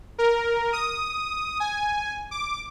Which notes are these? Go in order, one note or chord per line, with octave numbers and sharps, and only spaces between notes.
A#4
D#6
G#5
D6